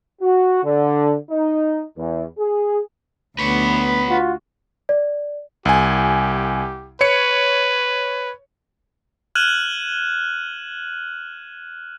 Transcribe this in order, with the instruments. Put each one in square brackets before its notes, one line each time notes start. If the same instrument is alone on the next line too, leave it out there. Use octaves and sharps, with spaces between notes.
[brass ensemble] F#4
D3
D#4
E2
G#4
[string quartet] D2 [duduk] B3 [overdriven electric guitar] B4 C#5
[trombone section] F4 F#4
[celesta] D5
[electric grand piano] C2 G#5 [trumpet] G4
[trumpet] B4 [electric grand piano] C#5 C#7
[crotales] F6 F#6 G#6 D#7 E7 F#7